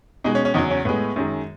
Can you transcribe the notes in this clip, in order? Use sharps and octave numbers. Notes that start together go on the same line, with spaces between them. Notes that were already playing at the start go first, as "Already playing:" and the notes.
B2 G#3 D#4
C#4
C#4
E2 C#3 F#3 D#4
C#4
A2 G#3 B3
F#2 D#3 G#3